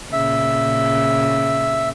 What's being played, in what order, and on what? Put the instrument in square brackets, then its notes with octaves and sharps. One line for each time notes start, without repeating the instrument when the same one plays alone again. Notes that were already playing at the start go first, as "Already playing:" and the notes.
[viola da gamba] A#2 C#3 [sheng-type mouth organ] E5